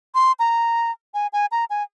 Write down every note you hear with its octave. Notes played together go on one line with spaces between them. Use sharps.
C6
A#5
G#5
G#5
A#5
G#5